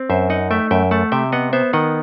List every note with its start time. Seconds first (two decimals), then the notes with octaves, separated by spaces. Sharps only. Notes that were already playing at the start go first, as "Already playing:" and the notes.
Already playing: C4
0.10 F#2 C5 E5
0.30 D#4 D#5 F#5
0.51 A3 E5 G5
0.71 F#2 E5 G5
0.91 A3 F#5 A5
1.12 C3 E5 G5
1.32 B3 D#5 F#5
1.53 B3 C5 E5
1.73 D#3 D#5 F#5